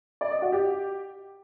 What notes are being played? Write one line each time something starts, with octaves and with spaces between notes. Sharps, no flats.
D5
D#5
F#4
G4